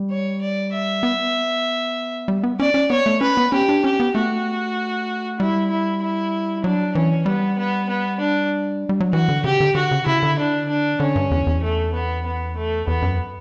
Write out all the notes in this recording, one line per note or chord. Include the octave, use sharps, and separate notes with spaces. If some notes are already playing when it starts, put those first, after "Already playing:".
Already playing: G3
C#5
D5
E5
B3
G3
B3
C#4 D5
C#4
B3 C#5
A3
C#4 B4
B3
C#4 G4
D4
C#4 G4
B3
A3 F#4
G3 E4
E4
E4
F#3 D4
E3 C#4
G3 B3
B3
B3
D4
G3
F#3
E3 F#4
D3
C#3 G4
D3
D3 F#4
C#3
C#3 E4
D3
D4
D4
D3 C#4
G2
E2
E2
A3
B3
B3
A3
E2 B3
F#2